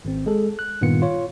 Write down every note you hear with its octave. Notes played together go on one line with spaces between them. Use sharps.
G#1 C4
G#3 G#4 A4
F#6
G2 A#2 D#3 B3 F4 C#7
F4 C#5